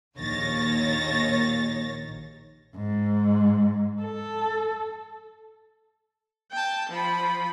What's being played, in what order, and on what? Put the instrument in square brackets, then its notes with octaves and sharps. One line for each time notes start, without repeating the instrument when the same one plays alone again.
[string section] A#1 D#2 D#3 C#5 A6 A#6
[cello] G#2
A4
[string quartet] G5 A5
F3 B5